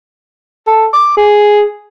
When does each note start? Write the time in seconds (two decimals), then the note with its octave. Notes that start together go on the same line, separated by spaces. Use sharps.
0.67 A4
0.93 D6
1.17 G#4